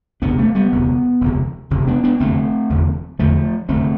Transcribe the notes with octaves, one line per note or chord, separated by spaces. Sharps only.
E1 D2 C3 B3 D4
A3 C4
G3 B3
E1 D2 C3
E1 D2 C3
E1 D2 C3
B3 D4
B3 D4
F1 E2 D3 A3 C4
F1 E2 D3
F1 E2 D3 F3 A3
F1 E2 D3 A3 C4